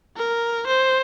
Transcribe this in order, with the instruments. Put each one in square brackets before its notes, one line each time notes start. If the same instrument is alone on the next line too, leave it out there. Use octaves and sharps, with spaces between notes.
[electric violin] A#4
C5